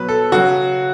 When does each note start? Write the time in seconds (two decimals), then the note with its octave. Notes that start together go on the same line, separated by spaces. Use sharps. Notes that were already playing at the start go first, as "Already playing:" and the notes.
Already playing: B2 F#3 B4
0.09 A4
0.32 C#3 F#3 F#4